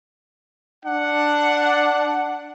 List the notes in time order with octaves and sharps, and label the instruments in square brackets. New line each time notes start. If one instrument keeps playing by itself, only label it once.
[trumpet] D4 [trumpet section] F#5